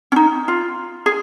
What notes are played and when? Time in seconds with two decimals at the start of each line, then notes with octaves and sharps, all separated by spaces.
0.12 C#4
0.16 D#4
0.48 F4
1.06 G#4